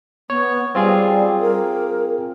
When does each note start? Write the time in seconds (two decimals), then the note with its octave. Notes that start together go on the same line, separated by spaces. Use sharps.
0.30 B3 C#5
0.75 G3 C4 F4 G#4
1.41 A#4